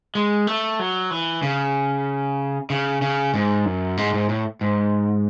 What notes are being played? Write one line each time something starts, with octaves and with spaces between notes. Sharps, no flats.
G#3
A3
F#3
E3
C#3
C#3
C#3
G#2
F#2
G#2
G#2
A2
G#2